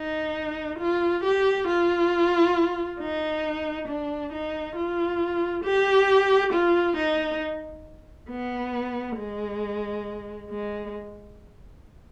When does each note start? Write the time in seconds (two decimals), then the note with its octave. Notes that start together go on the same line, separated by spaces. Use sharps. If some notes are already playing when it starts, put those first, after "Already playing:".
Already playing: D#4
0.79 F4
1.24 G4
1.67 F4
2.99 D#4
3.88 D4
4.32 D#4
4.75 F4
5.64 G4
6.53 F4
6.96 D#4
8.29 B3
9.17 G#3
10.50 G#3